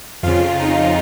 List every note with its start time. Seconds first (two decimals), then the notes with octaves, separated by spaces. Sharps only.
0.23 F2 C#3 F4
0.60 D#4